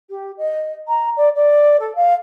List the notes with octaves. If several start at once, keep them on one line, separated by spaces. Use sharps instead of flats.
G4
D#5
A#5
D5
D5
A4
F5